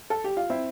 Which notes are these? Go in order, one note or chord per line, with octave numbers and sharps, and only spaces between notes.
A4
G4
F4
C4 E4